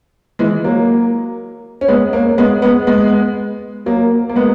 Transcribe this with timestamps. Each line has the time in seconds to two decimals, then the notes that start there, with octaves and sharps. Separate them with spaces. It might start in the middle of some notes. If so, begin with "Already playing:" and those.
0.39 E3 G#3
0.64 F#3 A#3
1.81 C#4
1.88 G#3 B3
2.13 A#3 C#4
2.38 G#3 B3
2.62 G#3 B3
2.87 G#3 B3
3.86 F#3 A#3
4.29 A#3
4.36 G#3 B3